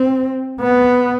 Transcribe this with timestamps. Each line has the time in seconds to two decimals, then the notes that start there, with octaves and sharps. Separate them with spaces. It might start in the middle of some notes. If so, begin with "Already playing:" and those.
Already playing: C4
0.60 B3